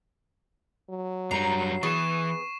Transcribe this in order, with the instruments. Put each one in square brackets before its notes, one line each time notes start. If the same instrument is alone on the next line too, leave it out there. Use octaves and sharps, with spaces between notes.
[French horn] F#3
[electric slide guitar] F#2 G3 [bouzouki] A#5 [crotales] C7
[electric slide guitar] E3 [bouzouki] B3 G#4 B4 [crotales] C#6 E7